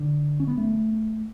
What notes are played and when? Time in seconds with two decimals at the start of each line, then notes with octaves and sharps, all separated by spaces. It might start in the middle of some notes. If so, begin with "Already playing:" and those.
Already playing: D3
0.40 C#4
0.47 B3
0.58 A3